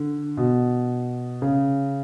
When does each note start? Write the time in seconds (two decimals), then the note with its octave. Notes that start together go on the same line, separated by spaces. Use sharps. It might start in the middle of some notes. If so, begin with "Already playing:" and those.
Already playing: D3
0.37 B2
1.42 C#3